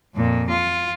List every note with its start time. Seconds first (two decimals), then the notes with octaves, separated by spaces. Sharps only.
0.15 F2 A#2
0.50 F4